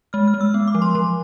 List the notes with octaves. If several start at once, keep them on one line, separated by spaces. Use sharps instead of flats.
G#3 F6
F6
G#3
E6
B3
D6
F3
C6
F3 C6